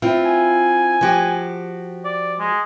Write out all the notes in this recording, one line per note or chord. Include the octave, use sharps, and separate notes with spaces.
C4 E4 F4
G#5
F3 F#4 G4
D5
G#3